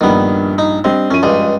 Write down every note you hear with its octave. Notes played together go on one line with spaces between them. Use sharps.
A#1 G2 D#3 G3 B3
D#4
G3 C4 D4 D#5
F#2 F3 C#4 D#7
C#2 G2 G#3